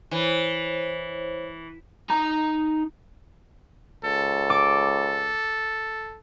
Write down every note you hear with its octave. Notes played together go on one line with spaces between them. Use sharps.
E3 C5 C#5
D#4 A#5
C#2 A4
D6